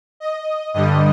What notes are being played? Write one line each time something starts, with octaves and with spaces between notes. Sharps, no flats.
D#5
G2 D3 G3 D#5